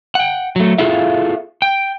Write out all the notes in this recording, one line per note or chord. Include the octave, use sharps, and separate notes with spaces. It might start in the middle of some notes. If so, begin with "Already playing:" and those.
F#5 G5
F#3 A3
E4 F4 G#4 A4 E5 F5
G5